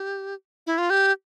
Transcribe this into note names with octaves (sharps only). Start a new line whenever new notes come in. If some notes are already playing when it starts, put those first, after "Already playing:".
Already playing: G4
E4
F4
G4